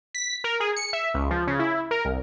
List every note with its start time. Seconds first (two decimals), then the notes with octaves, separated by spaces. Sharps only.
0.15 B6
0.44 A#4
0.60 G#4
0.76 C#7
0.93 E5
1.14 C#2
1.31 F3
1.47 C#3
1.59 E4
1.91 A#4
2.05 C2